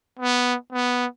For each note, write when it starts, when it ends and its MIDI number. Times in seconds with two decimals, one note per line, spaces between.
0.20 0.55 59
0.73 1.07 59